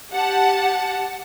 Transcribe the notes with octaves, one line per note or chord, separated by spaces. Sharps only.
G4 F#5 A5